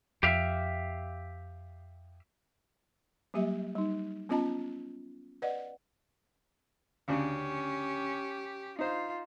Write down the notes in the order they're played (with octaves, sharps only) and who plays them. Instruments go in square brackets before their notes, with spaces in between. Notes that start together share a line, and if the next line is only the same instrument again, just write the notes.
[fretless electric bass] F2 [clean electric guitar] G4 E5 F5
[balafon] F#3 G3 A#3 G4 E5
G3 D#4
B3 C#4 F4 D#5 A5 A#5
B4 D5 D#5 F#5
[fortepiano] D2 C#3 D4 [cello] C#4 G4
[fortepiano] D#4 C5 [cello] F4